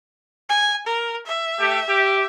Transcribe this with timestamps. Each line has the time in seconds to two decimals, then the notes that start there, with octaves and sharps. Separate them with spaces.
0.49 G#5
0.87 A#4
1.26 E5
1.59 A3 G4
1.89 G4